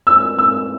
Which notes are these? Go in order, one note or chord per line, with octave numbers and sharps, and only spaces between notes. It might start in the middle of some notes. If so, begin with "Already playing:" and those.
E6
E6